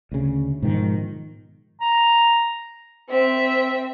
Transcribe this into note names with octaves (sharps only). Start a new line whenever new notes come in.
D2 C#3
G#2 B2 D#3 F3
A#5
C4 E5